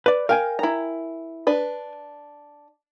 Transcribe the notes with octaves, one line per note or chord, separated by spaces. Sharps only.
B4 D5
A#4 F5 G5 G#5
E4 A#5
D4 B4